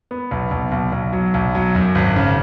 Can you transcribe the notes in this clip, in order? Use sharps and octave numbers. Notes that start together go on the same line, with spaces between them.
B3
B1
B1
B1
B1
F#3
B1
F#3
F#2
G#1
C#3